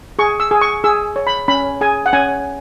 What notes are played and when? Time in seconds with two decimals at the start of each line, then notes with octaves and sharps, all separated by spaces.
0.19 G#4 C#6
0.40 E6
0.51 G#4
0.61 C#6
0.84 G#4 E6
1.16 C#5
1.27 B5
1.48 C#4 B5
1.81 G#4 G#5
2.06 F#5
2.13 C#4 G#5